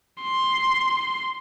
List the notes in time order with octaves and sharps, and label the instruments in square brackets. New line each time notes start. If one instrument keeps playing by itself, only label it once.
[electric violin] C6